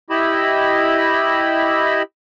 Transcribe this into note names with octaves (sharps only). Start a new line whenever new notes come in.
E4 G4 D#5 B5 E6